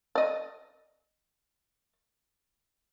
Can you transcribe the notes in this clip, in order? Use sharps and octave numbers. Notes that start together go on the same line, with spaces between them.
D5 D#5